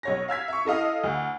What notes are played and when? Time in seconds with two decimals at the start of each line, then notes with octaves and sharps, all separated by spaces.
0.03 B1 C#5 A#6
0.28 F5 E6 G#6 B6
0.48 E5 C#6
0.65 E4 A4 D#5 F5 D#6
1.04 D2